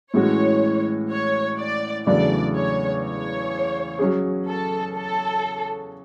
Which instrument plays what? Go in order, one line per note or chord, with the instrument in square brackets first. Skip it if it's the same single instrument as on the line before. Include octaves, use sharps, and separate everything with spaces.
[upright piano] A2 E3 G#3 C#4 F#4 [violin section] C#5
[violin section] C#5
D5
[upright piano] E2 C#3 F#3 A3 D4 [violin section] D5
[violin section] C#5
C#5
[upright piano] F#3 C#4 G#4
[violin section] A4
A4